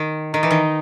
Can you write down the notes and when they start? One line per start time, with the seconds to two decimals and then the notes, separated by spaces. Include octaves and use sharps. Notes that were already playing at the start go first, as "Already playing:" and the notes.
Already playing: D#3
0.34 D#3 D#4
0.43 E3
0.50 D#3